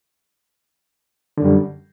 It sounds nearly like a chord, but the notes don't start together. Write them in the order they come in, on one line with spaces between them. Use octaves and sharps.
D3 F#2 G3